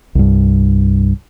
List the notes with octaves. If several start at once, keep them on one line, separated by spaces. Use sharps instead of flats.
C2 G2